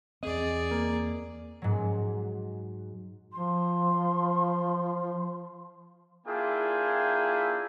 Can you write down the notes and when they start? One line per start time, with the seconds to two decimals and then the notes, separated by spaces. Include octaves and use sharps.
0.23 E2 C4 G#4 D5 D#5
0.71 A#3
1.62 G#2 F#3
3.33 F3 C6
6.26 A#3 D4 E4 F4 G#4 G5